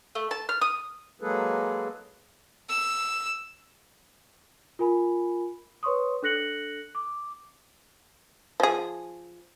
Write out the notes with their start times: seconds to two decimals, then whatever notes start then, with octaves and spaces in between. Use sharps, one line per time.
0.15 A3
0.31 A5
0.49 F6
0.62 D#6
1.21 F#3 G#3 A#3 G#4 A4 B4
2.69 E6
4.79 F4 A#4 G#5 B5
5.83 B4 C#5 C6 C#6 D#6
6.22 D4 A4 F#6 A#6 C#7 F#7
6.95 D6
8.60 F3 G#4